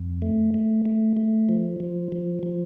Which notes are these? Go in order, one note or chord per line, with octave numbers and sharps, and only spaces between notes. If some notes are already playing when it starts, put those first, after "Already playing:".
Already playing: F2
A3
A3
A3
A3
F3
F3
F3
F3